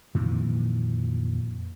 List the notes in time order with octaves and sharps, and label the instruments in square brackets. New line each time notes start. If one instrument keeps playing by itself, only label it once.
[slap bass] F2 A#2 D#3 E3